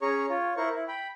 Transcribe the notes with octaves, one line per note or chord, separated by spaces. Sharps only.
C#4 G#4 C#5 A#5 C#6
F4 C#5
E4 A#4 C5 C#6
E4
G5 B5